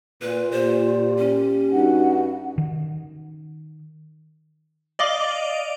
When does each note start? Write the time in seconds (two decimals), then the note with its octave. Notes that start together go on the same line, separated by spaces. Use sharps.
0.22 A#2 F4 B4
0.52 A#2 G4 C5 D5
1.18 C#4
1.72 G2 D#4 F#4 F#5
2.58 D#3
4.99 D5 D#5 F5 D6